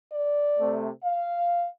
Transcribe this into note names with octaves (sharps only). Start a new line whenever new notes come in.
D5
C3 A3
F5